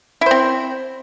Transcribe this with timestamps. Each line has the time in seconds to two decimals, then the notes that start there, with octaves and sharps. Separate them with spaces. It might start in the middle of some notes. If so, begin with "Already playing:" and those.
0.21 E4
0.26 C5
0.31 C4